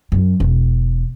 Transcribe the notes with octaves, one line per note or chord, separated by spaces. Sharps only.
F#2
E1